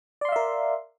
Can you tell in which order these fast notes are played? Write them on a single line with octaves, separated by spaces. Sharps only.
D5 C6 F5 E5 A#4